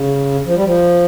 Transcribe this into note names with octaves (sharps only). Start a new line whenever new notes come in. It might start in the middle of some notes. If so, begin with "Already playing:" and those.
Already playing: C#3
F3
G3
F3